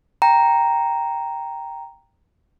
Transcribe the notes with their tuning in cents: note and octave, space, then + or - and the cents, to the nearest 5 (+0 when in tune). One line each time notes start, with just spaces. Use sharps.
G5 +0 A#5 +0